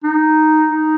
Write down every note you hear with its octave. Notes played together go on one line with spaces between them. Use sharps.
D#4
D#4